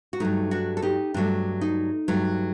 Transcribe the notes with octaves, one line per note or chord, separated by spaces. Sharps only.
F#4
G2 F#3 A3 D#4
D4 F#4
A4
D#4 G4
G2 F#3 A3 D4
D#4
G2 F#3 A3